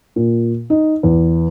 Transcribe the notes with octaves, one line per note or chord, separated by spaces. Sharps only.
A#2
D#4
E2